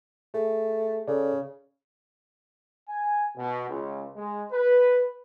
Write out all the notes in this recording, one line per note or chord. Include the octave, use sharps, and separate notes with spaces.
A3 G#4
C#3 A4 D5
G#5
B2
C#2
G#3
B4